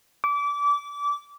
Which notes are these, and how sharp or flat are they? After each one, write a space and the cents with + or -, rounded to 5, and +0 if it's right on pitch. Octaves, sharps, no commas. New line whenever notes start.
D6 -25